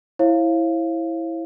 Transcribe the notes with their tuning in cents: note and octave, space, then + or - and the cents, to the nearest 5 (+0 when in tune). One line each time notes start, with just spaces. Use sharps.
E4 +0 C#5 -45 F5 -15